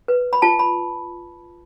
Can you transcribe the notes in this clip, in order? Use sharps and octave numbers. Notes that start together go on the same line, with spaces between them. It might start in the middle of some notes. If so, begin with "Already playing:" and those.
B4
B5
F4 A5
B5